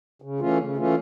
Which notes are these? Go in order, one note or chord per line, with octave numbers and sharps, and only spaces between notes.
C#3
E3 A3 C#4 F4
C#3
E3 A3 C#4 F4